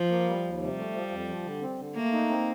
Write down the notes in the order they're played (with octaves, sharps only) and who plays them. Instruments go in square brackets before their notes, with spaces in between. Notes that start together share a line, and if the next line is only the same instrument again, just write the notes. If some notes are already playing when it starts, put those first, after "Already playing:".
Already playing: [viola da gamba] F3
[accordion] A#3
G3
D#2
[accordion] C3 [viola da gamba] G3
[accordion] A3
F3
F2
F3
D3
C4
D3
[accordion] A3 [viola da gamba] A#3
[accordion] D#4
C4